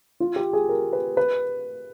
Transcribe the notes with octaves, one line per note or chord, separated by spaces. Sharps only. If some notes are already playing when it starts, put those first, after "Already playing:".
F4
G4
G#4
A#4
B4
B4